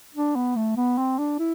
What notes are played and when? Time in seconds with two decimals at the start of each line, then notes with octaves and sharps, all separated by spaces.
0.15 D4
0.35 B3
0.56 A3
0.76 B3
0.98 C4
1.19 D4
1.39 E4